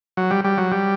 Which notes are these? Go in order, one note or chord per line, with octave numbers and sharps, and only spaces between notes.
F#3
G3
G3
F#3
G3